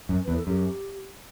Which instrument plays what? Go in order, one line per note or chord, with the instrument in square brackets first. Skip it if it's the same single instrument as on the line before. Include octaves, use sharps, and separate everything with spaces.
[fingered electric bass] F#2
[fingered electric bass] E2 [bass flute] B4
[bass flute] A4
[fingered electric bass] F#2 [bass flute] G4